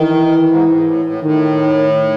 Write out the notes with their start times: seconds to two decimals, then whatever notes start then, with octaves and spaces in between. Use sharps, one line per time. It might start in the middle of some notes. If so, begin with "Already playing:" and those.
Already playing: D#3 E3
0.50 G#2
0.68 G#2
0.86 A2
1.05 A2
1.23 A2 D#3